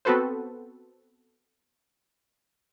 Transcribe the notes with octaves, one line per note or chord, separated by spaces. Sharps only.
B3 C4 F#4 A4 B4 C5